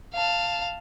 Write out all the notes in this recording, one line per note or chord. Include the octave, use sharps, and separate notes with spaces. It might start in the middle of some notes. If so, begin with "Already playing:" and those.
F5 A5